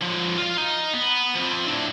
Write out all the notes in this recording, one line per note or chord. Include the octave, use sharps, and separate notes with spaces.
D3 F3
F4 F5
D#4
B3
F3 C4
A2 D4